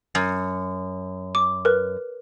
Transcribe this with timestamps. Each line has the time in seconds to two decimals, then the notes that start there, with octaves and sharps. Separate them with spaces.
0.15 F#2
1.35 D6
1.65 A#4 B4